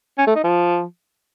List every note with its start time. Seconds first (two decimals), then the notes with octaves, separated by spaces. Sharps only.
0.18 C#4
0.27 A3
0.35 D#4
0.44 F3